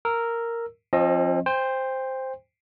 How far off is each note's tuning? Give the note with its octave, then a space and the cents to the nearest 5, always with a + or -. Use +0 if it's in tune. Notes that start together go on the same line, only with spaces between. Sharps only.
A#4 -5 E6 +0
F3 +0 C4 +40 D#5 +0
C5 +0 G5 +30